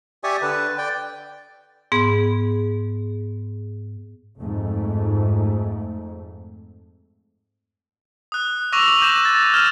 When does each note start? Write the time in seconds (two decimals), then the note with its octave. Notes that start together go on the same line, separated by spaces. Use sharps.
0.24 G4 D5 E5 G#5 C#6 D#6
0.42 D3 B4 A5
0.78 D5 G5
1.92 G#2 B3 G#4
4.39 F2 G#2 A3
8.32 D#6 F#6
8.72 C#6 D6 E6 A#6 D#7 F7
9.01 D6 G6 A#6 E7
9.25 A6
9.54 F6 G#6 E7